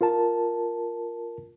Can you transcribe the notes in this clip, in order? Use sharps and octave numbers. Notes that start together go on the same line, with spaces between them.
F4 A#4 A5